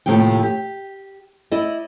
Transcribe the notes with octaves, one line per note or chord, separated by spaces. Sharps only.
D#2 A2 C3 F3 G5
G4
E4 D5 D#5